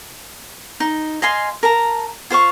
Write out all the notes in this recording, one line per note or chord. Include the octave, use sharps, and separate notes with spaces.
D#4
D#5 F5 G#5 C6
A#4 A5 A#5
F4 C5 F5 C#6